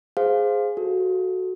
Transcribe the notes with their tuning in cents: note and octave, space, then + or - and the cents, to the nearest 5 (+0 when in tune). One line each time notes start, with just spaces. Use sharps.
G#4 +0 C5 +0 F5 +0
F#4 +0 A4 -10